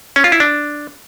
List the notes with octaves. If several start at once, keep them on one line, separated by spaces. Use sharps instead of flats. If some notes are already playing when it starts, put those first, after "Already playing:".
C#4
F4
E4
D4